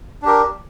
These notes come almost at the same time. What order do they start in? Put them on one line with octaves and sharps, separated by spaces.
D4 G4 A#4